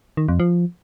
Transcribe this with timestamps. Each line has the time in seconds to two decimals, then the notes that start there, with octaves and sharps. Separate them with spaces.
0.17 D#3
0.28 F2
0.40 F3